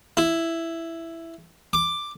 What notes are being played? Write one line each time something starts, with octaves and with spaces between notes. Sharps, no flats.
E4
D6